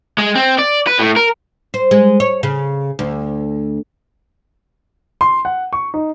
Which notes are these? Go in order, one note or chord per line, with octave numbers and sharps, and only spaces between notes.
G#3
C4
D5
B4
A2
A#4
C5
G#3
C#5
C#3
D2
C6
F#5
C#6
D#4